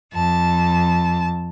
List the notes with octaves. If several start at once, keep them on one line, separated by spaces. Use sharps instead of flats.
F2 A5